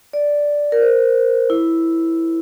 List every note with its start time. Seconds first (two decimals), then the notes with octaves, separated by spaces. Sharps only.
0.13 D5
0.72 A#4
0.81 C5
1.50 E4